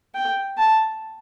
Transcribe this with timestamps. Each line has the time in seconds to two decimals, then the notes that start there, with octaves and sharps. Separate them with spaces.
0.14 G5
0.57 A5